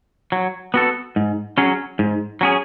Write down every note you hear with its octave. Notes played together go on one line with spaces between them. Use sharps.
F#3
B3 F#4 A4
G#2
F#3 C#4 G#4
G#2
F#3 C#4 G#4